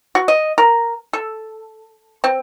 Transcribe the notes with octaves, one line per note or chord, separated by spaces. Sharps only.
F#4
D#5
A#4
A4
C4